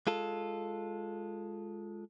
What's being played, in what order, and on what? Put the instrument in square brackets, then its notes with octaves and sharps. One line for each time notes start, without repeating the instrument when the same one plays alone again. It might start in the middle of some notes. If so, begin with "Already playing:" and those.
[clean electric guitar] G#3 F4 A4